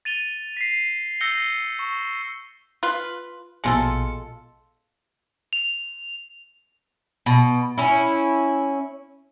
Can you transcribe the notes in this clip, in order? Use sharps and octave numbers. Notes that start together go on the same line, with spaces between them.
A6 D#7 F7 G7
B6 C7
E6 G6 A#6 C#7 G7
C#6
F4 B4
A#1 B2 G#3 F4 A4 C#7
F7
B2
C#4 E4